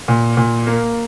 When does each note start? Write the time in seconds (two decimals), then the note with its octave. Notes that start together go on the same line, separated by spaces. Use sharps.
0.08 A#2
0.37 A#2
0.67 A#3